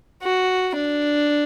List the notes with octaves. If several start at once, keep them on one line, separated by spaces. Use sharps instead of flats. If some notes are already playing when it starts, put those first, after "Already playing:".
F#4
D4